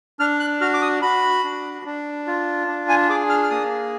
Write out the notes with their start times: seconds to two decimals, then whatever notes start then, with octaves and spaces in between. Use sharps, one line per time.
0.19 D4 F6
0.40 F#6
0.61 F#4 F6
0.74 D6
0.82 D#6
1.02 F#4 B5
1.44 D4
1.85 D4
2.27 F4
2.68 D4
2.89 G#5
3.09 G#4 D6
3.29 F6
3.43 F6
3.51 A#3 D#6